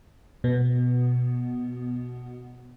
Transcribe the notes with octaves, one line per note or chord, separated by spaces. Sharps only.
B2 B3